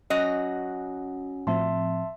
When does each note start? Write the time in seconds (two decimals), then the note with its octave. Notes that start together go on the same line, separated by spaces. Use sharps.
0.10 F#3 C#4 F#4 D#5
1.47 A2 F3 C4 E5 A5 C6